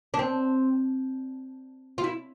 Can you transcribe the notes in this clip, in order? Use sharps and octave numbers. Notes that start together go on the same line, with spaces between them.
D4
C4
F4
E4